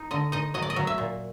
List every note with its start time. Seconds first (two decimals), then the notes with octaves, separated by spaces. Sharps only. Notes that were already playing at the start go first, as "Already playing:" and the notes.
Already playing: D#4
0.11 D3 D#5
0.32 D#4 D#5
0.54 F#3 D#5
0.62 D5
0.70 D#5
0.76 F#3
0.87 E5
0.98 A#2